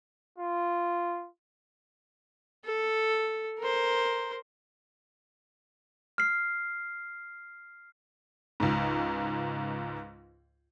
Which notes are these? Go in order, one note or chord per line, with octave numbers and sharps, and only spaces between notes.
F4
A4
A#4 C5
F6 C7
C#2 G#2